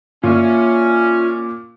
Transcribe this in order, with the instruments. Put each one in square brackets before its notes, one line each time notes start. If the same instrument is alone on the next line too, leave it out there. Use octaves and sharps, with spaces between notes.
[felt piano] A#2 [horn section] C#4 [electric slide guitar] F4 E5